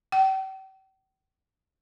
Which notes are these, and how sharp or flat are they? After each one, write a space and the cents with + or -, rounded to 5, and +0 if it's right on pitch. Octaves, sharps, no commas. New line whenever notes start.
G5 -40